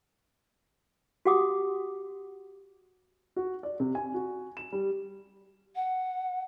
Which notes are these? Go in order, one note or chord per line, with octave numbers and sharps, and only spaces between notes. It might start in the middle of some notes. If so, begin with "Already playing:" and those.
F#4 G4 F#5 D6 D#6
F#4
D5
C3
G#5
F#4
E7
G3
F#5